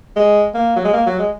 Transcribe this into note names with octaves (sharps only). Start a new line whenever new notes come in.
G#3
A#3
F#3
G#3
A#3
F#3
G#3